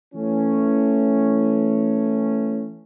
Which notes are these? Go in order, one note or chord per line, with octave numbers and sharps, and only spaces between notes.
E3 A3 C#4